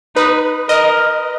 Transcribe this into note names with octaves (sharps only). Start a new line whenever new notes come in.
D#4 B4
A#4 D#5